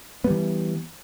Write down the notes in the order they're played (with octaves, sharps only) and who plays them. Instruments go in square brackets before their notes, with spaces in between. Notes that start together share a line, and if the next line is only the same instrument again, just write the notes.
[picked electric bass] B3
G3
E3